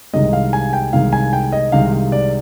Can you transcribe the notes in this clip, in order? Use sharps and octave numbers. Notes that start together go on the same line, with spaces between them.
C2 C3 D#3 G#3 D#5
F5
G#5
G5
C2 C3 D#3 G#3 F5
G#5
G5
D#5
C2 C3 D#3 G#3 F5
D5